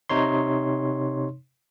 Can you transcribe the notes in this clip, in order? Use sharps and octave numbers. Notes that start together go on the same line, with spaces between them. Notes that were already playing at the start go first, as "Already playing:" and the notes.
C3 D#4 C#5 C6